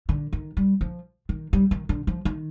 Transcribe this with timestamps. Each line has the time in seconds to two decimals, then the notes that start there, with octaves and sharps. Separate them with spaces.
0.09 D3
0.33 D#3
0.57 G3
0.81 F3
1.29 D#3
1.53 G3
1.71 D#3
1.89 D3
2.07 F3
2.25 D#3